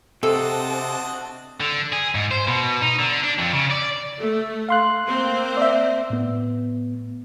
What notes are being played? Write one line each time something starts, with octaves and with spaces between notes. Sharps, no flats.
C3 C4 D4 F#4 A4 D#5 A5
D3
G#4
G#2
C5
B2
D#4
D3
D4
F2
C#3
D5
A3
F5 C6 F#6
A#3 C4 C5
D5 E5
A2 B3